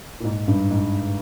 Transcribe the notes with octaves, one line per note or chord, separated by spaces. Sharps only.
A#2
G#2
G2
G#2